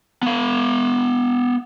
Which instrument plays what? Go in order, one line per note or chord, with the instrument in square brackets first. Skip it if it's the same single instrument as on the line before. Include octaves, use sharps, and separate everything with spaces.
[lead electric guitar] B3 F5